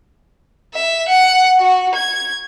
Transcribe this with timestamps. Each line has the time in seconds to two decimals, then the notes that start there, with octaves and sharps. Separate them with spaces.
0.74 E5
1.08 F#5
1.60 F#4
1.95 G#6